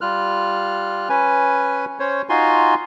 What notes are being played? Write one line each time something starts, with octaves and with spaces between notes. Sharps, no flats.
G3 F4 F6 F#6
C#4 B4 G#5
C#4 C5 C#5
D#4 F4 F#4 G#5 C6